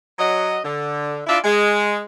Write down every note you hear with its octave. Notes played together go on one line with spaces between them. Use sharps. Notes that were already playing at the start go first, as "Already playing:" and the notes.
F#3 D#5
D3
D4 E4 F4 D5 E5
G#3